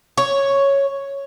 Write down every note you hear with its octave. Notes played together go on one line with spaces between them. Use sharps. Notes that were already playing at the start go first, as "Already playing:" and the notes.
C#5